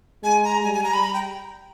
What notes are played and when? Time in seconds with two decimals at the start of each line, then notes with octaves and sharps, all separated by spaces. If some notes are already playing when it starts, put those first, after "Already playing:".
0.23 G#3 G#5
0.44 A#5
0.64 G3 G#5
0.74 G#5
0.84 A#5
0.93 B5
1.04 A#5
1.13 G5